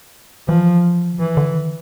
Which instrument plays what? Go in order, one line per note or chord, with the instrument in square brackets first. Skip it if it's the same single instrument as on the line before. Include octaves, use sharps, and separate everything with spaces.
[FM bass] E3 [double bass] F3
[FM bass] D3
[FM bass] D#3 [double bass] E3
[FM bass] D3
D#3